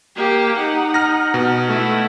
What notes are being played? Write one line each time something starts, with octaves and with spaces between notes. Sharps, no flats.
A#3 G4
D#4 F#5
F6 A#6
B2
A3 E4